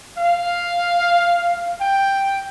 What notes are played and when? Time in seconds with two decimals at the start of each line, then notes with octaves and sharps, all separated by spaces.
0.18 F5
1.81 G5